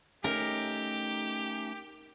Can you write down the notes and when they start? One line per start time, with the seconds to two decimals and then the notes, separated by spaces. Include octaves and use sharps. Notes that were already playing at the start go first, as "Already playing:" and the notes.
0.24 A3 C#4 D#4 G4 A#4